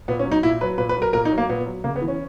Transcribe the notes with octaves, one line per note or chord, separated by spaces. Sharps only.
A#2 B3
C#4
F#3
D#4
A#2 E4
F#3 B4
A#2 B4
B4
F#3
A#4
A#2 A#4
D#4
F#3
A#3
A#2 B3
F#3
C#3 A#3
B3
E3
C#4